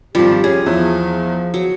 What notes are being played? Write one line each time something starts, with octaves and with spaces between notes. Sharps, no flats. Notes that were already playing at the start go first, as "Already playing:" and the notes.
G#1 F3 G3 G4
C#4 G#4
E2 F3 E4
F#3